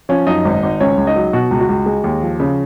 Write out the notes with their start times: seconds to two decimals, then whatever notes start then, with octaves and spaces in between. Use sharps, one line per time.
0.09 F3 C#4 C#5
0.27 F#2 D#4 D#5
0.45 G#1
0.63 G#1
0.80 C#2 C#4 C#5
0.98 C#2
1.07 D#4 D#5
1.16 F#3
1.33 B2 F#4
1.51 C#2
1.60 F#4
1.69 C#2
1.86 G#3
2.04 D#2
2.22 F3
2.40 C#3